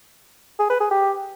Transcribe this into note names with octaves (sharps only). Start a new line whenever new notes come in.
G#4
B4
G#4
G4